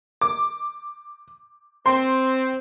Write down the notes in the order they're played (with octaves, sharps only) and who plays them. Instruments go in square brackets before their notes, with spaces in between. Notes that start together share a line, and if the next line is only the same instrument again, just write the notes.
[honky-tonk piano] D6
[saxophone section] C4 [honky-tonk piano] C6